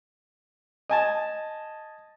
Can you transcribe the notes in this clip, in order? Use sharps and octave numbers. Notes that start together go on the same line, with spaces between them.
D#5 G#5 A5